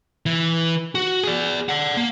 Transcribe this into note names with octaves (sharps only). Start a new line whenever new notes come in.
E3
F#4
G#4 D5
D5 F#5
A#3